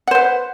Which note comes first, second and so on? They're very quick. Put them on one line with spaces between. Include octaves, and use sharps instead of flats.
F#5 C5 B4